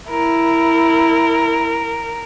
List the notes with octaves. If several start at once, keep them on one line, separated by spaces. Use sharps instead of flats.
E4 A#4